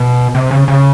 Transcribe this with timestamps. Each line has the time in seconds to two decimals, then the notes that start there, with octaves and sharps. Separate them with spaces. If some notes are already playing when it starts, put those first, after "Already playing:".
Already playing: B2
0.35 C3
0.51 C#3
0.68 C#3